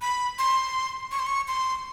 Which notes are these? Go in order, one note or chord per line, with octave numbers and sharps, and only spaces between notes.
B5
C6
C#6
C6
C#6
C6